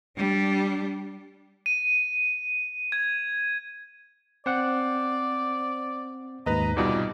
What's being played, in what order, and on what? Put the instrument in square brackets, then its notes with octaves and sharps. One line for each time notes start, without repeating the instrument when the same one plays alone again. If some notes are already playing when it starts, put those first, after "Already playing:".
[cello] G3 D4
[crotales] D#7
G#6
[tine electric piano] C4 F#5 [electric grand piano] C5 [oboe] D5
[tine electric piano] D#2 G#2 [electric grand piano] B4 D#5 [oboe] A#5
[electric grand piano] C2 B2 G3 [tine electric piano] D#4 F4 D#5 [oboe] D5